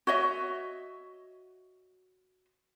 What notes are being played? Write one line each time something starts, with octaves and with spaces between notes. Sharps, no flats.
F#4 C#5 D#5 E5